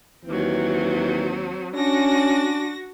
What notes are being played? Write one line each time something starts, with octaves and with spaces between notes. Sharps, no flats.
D#2 E3 F#3 C4
C#4 D4 F#4 A#6